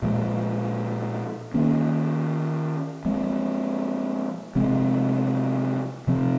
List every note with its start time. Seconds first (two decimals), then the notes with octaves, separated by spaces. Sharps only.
0.02 A#2 F3 G#3
1.54 D#3 A#3 C#4
3.05 F3 G#3 C4
4.55 C3 F3 G#3 C4
6.07 C3 F3 C4